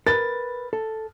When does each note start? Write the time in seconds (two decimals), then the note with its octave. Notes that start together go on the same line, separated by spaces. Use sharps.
0.07 A#4 B4 A6
0.73 A4